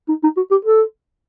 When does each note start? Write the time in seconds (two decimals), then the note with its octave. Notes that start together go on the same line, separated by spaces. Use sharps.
0.09 D#4
0.23 D#4
0.37 F#4
0.51 G4
0.65 A4